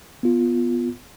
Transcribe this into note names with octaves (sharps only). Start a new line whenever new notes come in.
B3 F4